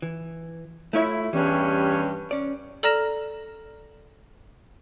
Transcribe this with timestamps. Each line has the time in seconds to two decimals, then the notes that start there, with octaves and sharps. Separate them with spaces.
0.02 E3
0.93 A3 E4 F4 C#5
1.33 E2 G2 E3 G3 C#4
2.31 C#4 D5
2.83 A4 D5 A#5 F6 A#6 E7